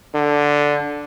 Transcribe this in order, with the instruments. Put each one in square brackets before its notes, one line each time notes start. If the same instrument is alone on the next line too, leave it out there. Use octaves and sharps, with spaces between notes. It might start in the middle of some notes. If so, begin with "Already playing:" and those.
[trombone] D3